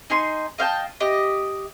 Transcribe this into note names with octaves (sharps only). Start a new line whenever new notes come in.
D#4 G#5 C6
D#5 F5 G5 A5
G4 D#5